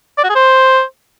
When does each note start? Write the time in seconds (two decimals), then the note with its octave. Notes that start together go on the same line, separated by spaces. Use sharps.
0.18 D5
0.24 F#4
0.30 G#4
0.36 C5